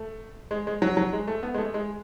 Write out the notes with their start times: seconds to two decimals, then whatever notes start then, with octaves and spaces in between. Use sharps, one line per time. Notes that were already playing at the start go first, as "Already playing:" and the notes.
Already playing: A3
0.51 G#3
0.67 G#3
0.82 F#3
0.97 F#3
1.13 G#3
1.28 A3
1.43 B3
1.54 G#3
1.58 A3
1.74 G#3